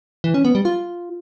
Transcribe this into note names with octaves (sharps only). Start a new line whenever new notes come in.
E3
C#4
B3
G3
F4